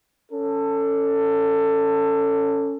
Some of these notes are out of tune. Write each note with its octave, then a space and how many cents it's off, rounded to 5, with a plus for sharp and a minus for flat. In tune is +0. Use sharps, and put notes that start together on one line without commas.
C#4 +5 A4 +20